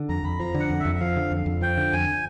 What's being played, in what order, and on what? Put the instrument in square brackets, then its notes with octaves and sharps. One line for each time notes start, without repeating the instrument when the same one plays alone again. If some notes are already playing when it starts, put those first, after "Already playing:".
Already playing: [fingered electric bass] D3
[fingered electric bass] F2 [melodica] A#5
[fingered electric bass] F2 [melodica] B5
[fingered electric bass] F3 [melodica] A#5
[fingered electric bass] D3
[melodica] F#5
[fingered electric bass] F2
[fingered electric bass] F2 [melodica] E5
[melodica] E5
[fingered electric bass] F3 [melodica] F5
[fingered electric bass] D3
F2
F2
[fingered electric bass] F3 [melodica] G5
[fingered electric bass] D3
[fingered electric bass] F2 [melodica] G#5